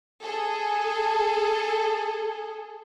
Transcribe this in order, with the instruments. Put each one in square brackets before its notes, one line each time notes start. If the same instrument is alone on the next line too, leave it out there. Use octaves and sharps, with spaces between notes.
[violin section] G#4 A4